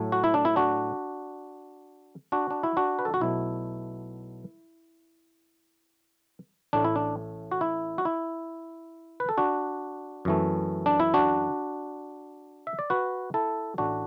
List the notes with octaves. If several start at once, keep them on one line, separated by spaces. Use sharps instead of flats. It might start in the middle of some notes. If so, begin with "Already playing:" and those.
Already playing: A2 F#3 A3
F#4
E4
D4
E4
D4 F#4
D4 F#4
D4
E4
D4 F#4
B4
A4
F#4
B1 B2 F#3 A3 E4
A1 A2 A3 D4
E4
D4
F#4
E4
F#4
E4
B4
A4
D4 F#4
F#2 E3 A3
D4
E4
D4 F#4
E5
D5
F#4 B4
E4 A4
A1 A2 A3 D4 F#4